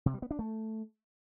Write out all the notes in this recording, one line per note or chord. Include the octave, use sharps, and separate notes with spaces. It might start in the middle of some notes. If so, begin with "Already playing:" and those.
C3
G3
B3
D4
A3